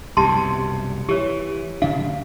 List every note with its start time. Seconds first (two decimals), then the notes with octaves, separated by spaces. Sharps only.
0.17 C2 F#2 B2 G4 A5 C6
1.09 E3 G4 C#5
1.82 D1 C#3 D4 F5